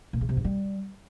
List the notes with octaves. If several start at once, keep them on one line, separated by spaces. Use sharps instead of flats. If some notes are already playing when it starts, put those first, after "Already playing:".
A#2
C#3
C3
G2
G3